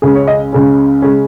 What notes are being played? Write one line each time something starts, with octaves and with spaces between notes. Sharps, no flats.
C#2 C#3 G#3 C#4 G#4
C#5
D#5
C#2 C#3 G#3 C#4
C#3 G#3 C#4